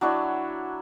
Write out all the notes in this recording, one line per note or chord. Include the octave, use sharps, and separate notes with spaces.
F#3 D4 E4 C#5